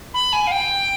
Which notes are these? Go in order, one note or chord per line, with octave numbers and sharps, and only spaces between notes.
B5
G#5
F5
G5